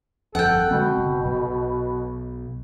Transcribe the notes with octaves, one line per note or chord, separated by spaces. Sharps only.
G1 F2 A4 F#5 G5
B2 D3 G#3 C4
F#1
B1